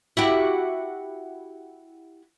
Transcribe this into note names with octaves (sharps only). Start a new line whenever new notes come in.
E4 F#4 G4